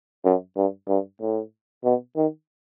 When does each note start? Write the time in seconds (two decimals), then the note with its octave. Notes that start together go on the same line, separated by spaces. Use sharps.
0.24 F#2
0.56 G2
0.88 G2
1.21 A2
1.84 B2
2.16 D#3